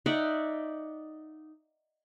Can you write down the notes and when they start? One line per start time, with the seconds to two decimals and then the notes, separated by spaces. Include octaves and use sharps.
0.06 D#4 D5 E5 F#5